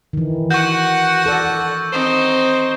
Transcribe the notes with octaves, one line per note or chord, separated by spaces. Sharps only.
D#3 E3
F#4 F#5 C#6 G6
A4 D5
C4 D#4 C5